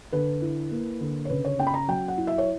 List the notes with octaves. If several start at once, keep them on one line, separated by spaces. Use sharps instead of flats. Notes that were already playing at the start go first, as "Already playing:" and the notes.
D3 B4
E4
A#3
D3
C#5
C#3 B4
C#5
C#4 G5
B5
A#5
F#3 G5
F#5
E4
E5
C#5